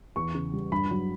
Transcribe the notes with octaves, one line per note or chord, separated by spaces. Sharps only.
E2 C#6
C#3
G3
G2 B5
F#3